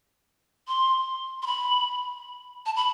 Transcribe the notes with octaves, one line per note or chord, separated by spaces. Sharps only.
C6
C6
B5
A5
B5